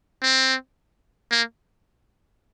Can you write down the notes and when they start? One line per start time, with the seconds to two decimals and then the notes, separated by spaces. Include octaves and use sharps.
0.23 C4
1.31 A#3